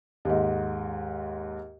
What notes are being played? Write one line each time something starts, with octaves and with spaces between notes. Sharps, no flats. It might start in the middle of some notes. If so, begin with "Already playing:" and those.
D#2 G#2